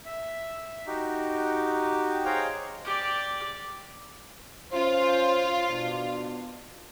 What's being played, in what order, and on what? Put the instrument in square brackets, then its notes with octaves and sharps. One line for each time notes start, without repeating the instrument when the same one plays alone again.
[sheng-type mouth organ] E5
D#4 F#4 G4
G#4 C5 C#5 F5 G5 A#5
[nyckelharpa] G4 D5
[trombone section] C#4 C5 [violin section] F4
[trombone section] B2 D4